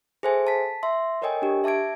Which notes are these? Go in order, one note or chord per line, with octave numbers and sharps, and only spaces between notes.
G#4 A4 C5 E5 G#5
A5 B6
E5 C6
A4 A#4 C#5 D#5 G5 G#5
D4 G4
E5 A5 D6 G#6 D7